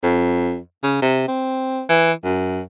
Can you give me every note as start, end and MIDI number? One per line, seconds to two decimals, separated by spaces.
0.03 0.58 41
0.83 0.98 49
1.02 1.24 48
1.28 1.82 60
1.89 2.12 52
2.24 2.61 42